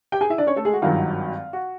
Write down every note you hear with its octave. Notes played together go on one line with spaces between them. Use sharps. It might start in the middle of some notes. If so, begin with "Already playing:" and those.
G4 G5
G#4 G#5
E4 E5
D4 D5
C#4 C#5
A3 A4
G#3 G#4
F#4
G#1 G2 D#3 F#3 F4
F#4